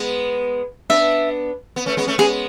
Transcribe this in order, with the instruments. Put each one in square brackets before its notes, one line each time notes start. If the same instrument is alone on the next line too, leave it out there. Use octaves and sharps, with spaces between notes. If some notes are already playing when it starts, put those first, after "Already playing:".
Already playing: [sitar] G#3 B3
[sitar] B3 D4 [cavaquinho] E5
[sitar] B3
A3 C#4
G#3 B3
A3 C#4
[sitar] G#3 B3 [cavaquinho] G#4